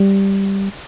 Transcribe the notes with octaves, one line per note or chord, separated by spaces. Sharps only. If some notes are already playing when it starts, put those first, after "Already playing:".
Already playing: G3